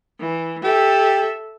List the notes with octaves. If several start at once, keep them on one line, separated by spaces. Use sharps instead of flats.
E3
G4 A4 E5